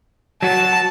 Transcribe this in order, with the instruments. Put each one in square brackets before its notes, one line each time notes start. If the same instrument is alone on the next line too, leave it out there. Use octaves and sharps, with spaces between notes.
[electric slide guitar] F#3 F#4 [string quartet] A5